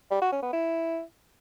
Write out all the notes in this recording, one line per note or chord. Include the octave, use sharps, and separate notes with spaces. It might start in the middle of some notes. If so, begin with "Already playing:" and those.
G3
F#4
C#4
B3
E4